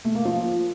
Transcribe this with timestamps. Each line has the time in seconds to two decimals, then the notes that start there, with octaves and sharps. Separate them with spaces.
0.05 A3
0.15 A#3
0.25 F3